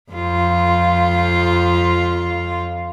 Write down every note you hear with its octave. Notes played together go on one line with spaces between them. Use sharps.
F2 F4